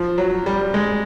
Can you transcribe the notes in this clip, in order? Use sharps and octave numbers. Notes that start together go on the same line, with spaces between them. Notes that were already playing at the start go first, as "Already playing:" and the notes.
Already playing: F3
F#3
G3
G#3